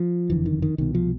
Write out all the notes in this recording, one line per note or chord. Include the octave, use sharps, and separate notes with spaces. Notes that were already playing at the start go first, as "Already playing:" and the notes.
Already playing: F3
F#1 F2 D3 E3
D#3
D#3
C2 B2 D#3
F3